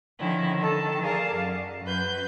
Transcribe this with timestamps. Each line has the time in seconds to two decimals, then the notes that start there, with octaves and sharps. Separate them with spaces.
0.18 D3 D#3 F3 C#4 E4
0.58 D#3 A4 A5
1.02 G#4 A#4 D5 F5 A5
1.35 F#2
1.83 F#2 B4 G6